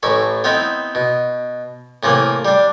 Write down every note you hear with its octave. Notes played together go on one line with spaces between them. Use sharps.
A1 A2 E4 C#6
B3 C4 D#4 E4
B2
A2 C3 E3 A#3
G3 D4